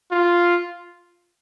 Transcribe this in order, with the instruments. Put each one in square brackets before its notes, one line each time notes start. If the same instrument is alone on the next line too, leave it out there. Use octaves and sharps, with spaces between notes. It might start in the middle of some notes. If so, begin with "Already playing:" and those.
[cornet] F4